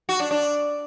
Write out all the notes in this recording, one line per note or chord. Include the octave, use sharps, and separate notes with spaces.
F#4
D4
D4